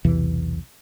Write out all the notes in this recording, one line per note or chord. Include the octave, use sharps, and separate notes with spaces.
B1 E2 C3 E3